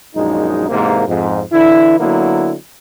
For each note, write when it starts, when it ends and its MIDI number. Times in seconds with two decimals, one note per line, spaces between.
0.15 0.69 34
0.15 0.69 42
0.15 0.69 56
0.15 0.69 63
0.69 1.05 40
0.69 1.05 44
0.69 1.05 48
0.69 1.05 58
1.08 1.41 41
1.08 1.41 44
1.52 1.98 50
1.52 1.98 52
1.52 1.98 64
2.00 2.54 50
2.00 2.54 54
2.00 2.54 58
2.00 2.54 59
2.00 2.54 64